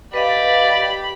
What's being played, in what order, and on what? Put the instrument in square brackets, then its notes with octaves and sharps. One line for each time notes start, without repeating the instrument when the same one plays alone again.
[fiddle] G4 B5 [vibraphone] B4 D#5 F5 [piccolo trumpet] D5